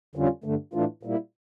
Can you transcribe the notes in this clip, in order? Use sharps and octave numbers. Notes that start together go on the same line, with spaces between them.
F2 D3 G3 C#4 F4
G2 D3 A3
A2 E3 A3 D4 F4
A#2 G3 A#3 E4